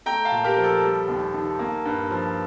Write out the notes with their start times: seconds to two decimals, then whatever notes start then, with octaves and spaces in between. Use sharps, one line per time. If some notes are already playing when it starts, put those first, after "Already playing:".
0.06 A3 G5 A#5
0.25 F5 A5
0.32 A#2
0.44 G4 A#4
0.57 F3
0.64 A4
0.83 G3
1.08 D#2
1.33 D#3
1.59 A#3
1.85 G2
2.10 F3